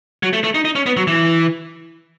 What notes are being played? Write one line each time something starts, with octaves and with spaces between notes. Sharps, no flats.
F#3
A3
A3
D#4
D#4
C#4
B3
F#3
E3